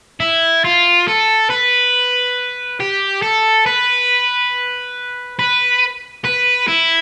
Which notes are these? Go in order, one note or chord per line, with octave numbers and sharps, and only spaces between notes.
E4
F4
A4
B4
G4
A4
B4
B4
B4
E4